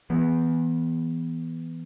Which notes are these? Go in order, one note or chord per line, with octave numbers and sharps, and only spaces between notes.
E3 B3